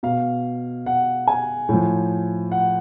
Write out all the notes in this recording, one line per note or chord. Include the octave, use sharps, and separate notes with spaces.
B2 F5
F#5
G#5
A2 F3
F#5